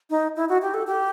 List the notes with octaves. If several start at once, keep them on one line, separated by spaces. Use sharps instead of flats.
D#4
E4
F#4
G4
A4
G4